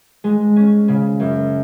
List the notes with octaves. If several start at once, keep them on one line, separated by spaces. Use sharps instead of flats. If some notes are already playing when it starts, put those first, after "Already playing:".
G#3
C#4
C#3
F#2